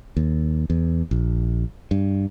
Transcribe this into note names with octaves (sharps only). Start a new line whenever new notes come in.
D#2
E2
A#1
G2